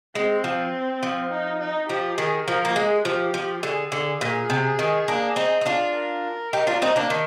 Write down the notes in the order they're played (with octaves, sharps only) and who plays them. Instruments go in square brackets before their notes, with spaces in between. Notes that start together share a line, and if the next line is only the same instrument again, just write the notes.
[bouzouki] G#3 [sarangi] C4
[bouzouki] F3
F3
[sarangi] D#4
D#4
[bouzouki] F3 [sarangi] G4
[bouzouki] D#3 [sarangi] G#4
[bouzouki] F3 [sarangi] A#4
[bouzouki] A#3
[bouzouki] G#3 [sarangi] G#4
[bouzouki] F3 [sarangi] G4
[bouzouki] F3
[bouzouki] D3 [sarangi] G#4
[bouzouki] D3 [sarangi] G#4
[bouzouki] A#2 [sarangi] G#4
[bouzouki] C3
D#3
A#3 D4
C4 D#4
D#4
D4 F4
[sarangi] A#4
[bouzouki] D#4 G4
D4 F4
C4 D#4
A#3 D4
D#3